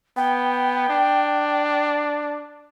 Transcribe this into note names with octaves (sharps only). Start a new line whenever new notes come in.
B3 G5
D4